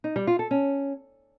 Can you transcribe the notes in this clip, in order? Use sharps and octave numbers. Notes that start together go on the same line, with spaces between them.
D#4
G3
F4
A4
C#4